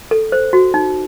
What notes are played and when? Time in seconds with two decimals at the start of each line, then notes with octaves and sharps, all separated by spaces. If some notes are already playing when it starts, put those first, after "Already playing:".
0.11 A4
0.32 C5
0.53 F#4
0.74 D#4